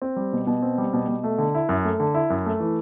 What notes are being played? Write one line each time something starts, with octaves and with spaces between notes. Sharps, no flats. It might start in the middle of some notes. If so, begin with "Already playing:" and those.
C4
G3
B2
B2
C4
G3
B2
B2
A3
D3
E4
F#2
A3
D3
E4
F#2
A3
E3